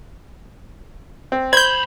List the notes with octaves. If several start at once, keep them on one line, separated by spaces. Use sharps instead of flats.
C4
C#2 C5 B5 G6 G#6